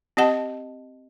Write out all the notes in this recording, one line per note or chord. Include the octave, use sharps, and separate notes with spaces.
C4 G4 D#5 F#5 A5